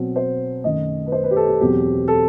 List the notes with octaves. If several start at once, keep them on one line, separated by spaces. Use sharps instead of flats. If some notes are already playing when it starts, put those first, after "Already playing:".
Already playing: B2 F#3 C4
C5
F#2 D#3 A3 D#5
B4
C5
B4
G4
A4
G4
E2 B2 F#3 C4 G4
A4